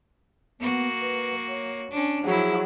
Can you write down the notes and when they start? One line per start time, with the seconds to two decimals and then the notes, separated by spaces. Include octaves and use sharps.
0.60 A#3 B3 F#4
1.01 B4
1.48 C#5
1.91 C#4 D4
2.25 F3 F#3 E4 G#4